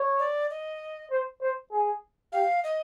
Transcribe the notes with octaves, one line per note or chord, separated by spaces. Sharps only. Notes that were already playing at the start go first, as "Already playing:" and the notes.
Already playing: C#5
D5
D#5
C5
C5
G#4
G4 F5
D#5